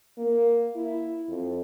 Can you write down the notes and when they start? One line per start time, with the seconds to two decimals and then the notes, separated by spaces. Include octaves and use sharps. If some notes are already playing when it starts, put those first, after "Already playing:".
0.18 A#3
0.76 E4
1.29 F2